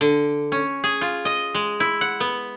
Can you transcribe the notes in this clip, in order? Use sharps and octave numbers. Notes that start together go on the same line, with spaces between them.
D3
C#4
G#4
F4
D#5
G#3
E4
F#5
B3